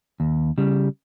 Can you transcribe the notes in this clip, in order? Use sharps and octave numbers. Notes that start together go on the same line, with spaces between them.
D#2
C#3 G3